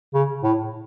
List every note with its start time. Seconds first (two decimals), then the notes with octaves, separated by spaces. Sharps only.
0.14 C#3
0.43 A2